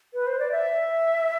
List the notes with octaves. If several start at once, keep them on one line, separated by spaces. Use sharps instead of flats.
B4
C5
D5
E5